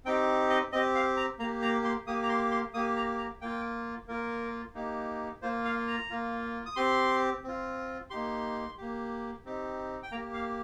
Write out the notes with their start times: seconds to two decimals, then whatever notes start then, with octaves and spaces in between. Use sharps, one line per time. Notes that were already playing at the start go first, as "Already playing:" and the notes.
0.05 C4 D#4 G4 G5
0.50 D#5
0.72 C4 D#5
0.75 G4
0.95 F5
1.17 A#5
1.39 A#3 A#5
1.43 G4
1.62 A#5
1.85 C6
2.07 A#3 G4 D#6
2.23 A#5
2.29 C6
2.51 C6
2.74 A#3 D#6
2.77 G4
2.97 A#5
3.18 A#5
3.41 A#3 F4 G5
4.08 A#3 F4 A#4
4.75 A#3 D#4 G4
5.42 A#3 F4 C5
5.65 F5
5.87 A#5
6.10 A#3 F4
6.66 D#6
6.76 C4 G4 C6
7.44 C4 F4
8.10 A#3 D#4 G4 C6
8.77 A#3 G4
9.45 C4 D#4 G4
10.03 G5
10.12 A#3 A#5
10.16 G4
10.34 F5